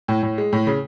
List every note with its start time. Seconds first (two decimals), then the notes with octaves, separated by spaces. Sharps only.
0.08 A2
0.23 A2
0.38 G#3
0.53 A2
0.67 C#3